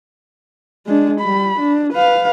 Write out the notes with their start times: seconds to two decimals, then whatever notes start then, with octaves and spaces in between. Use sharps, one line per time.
0.87 G#3 D4
1.21 G3 B5
1.59 D4
1.93 B4 F5